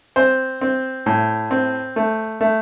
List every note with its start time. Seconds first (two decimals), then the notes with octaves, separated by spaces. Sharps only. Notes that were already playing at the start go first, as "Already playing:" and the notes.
0.16 C4 C5
0.61 C4
1.06 A2
1.51 C4
1.96 A3
2.41 A3